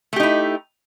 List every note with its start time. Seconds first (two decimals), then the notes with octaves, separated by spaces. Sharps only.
0.13 A3
0.16 G4
0.20 D#4
0.23 E4